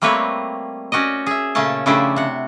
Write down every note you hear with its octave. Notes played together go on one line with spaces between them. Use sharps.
G3 A3 A#3 C4 B4 C#5
C#4 F#4 D5 D#5
G#4 E5
A#2 C#3 A3 C#4 A5
C#3 F3 A3 D4 E4 G4
C3 F#5